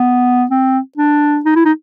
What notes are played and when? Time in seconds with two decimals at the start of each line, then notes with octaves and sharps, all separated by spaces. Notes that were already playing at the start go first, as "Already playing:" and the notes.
Already playing: B3
0.51 C4
0.98 D4
1.45 D#4
1.56 E4
1.65 D#4